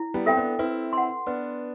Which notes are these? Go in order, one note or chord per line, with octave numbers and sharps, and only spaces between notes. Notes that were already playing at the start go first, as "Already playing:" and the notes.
Already playing: E4
G3 B3
C4 A4 E5 G5
B3 D4
C4 E4 B4
F#5 C6
B3 D4 B4